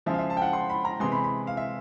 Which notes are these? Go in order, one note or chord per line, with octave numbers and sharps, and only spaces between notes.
C#3 F3 G#3 E5
F5
E5
A5
G5
F#5
C6
B5
A#5
C3 E3 G#3 C6
B5
B5
F5
E5